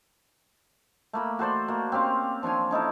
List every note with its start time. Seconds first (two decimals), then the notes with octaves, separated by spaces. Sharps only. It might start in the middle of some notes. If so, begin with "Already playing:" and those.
1.13 A3 A#3 B5
1.39 F#4 A4 C5 D5
1.68 A#3 F#4
1.92 C4 C#4 G4 F5
2.43 F3 D4 C#5 G#5
2.71 C#4 D#4 E4 A4